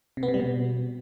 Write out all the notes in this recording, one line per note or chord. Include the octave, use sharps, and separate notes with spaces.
C3
B3
C3
G3
B2